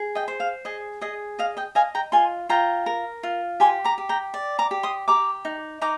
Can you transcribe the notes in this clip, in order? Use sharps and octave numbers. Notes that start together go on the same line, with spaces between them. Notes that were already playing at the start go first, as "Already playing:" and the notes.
Already playing: G#4
D#5 G5
C5
F5
G#4 D#5
G#4 D#5
D#5 F5
D#5 G5
D#5 F5 G#5
G5 A#5
F4 G#5 C6
F4 G5 A#5
A#4
F4
G4 G#5 C6
A#5 D6
G4
G5 A#5
D5
A#5 D6
G4
C6 D#6
G4 A#5 D6
D#4
D#4 A#5 D6